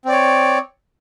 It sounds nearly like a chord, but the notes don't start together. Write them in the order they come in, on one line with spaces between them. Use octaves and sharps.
C4 D5 C#5